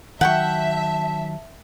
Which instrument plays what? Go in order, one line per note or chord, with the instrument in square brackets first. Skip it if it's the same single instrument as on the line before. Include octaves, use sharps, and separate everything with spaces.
[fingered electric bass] D#3 F#3 [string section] E5 [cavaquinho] F#5 G5 C#6 [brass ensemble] A5